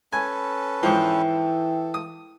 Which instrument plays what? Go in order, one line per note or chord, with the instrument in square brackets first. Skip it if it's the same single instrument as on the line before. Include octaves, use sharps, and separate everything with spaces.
[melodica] C#4 A4 B4 [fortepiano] G#5
[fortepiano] G#2 F3 [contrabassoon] E3 [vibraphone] G5
[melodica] A4
[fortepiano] D#6